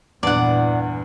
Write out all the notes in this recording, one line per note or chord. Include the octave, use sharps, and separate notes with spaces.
E2 G2 A#2 E3 D5 F#5